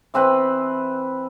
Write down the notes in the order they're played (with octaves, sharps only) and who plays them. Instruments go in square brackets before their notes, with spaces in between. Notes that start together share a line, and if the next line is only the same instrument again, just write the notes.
[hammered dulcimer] E3 C4 B4 B5